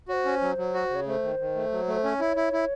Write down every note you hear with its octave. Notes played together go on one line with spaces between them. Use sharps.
F#4 C5 C#5
C#4
F#3
F#3
F#4
C#3
C#5
A3 C5 C#5
D#3
D#3
A3
F#3
A3
C5
C#4 C#5
E4
E4
E4